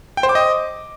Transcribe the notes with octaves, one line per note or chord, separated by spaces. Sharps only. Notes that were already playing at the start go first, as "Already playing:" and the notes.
G5
C5
D6
D#5